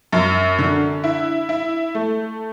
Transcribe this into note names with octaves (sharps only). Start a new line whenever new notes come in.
F#2
D3
E4
E4
A3